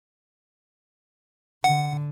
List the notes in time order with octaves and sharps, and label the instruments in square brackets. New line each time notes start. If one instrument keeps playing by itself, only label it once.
[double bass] D3 [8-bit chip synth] F#5